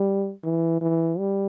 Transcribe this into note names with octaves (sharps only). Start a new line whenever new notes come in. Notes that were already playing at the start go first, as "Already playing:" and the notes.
Already playing: G3
E3
E3
G3